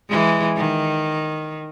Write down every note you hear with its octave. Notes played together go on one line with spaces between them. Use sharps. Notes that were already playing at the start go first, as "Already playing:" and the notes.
E3 G#3
D#3